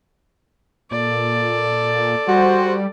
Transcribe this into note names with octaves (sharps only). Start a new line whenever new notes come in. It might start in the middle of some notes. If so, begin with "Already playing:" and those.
A#2 A4 D5
G3 F#4 C5